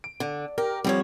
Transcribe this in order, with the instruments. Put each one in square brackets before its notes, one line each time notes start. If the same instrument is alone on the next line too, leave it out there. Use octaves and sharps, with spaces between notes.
[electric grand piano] D7
[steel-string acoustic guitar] D3
[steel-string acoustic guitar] G4 [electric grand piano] A#4
[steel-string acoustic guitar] D3 F3 C#5 [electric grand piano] G3 C4